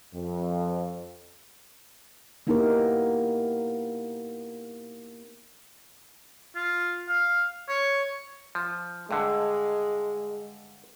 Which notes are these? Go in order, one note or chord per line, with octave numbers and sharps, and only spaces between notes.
F2
A#3 B3 D#4 E4 G4 A#4
F4
F5
C#5
F3
G2 D3 G#3